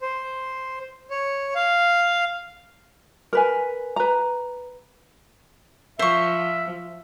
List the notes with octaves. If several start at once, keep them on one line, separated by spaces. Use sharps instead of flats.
C5
C#5
F5
A#4 B4 G#5
B4 A#5
F3 C5 E5 C#6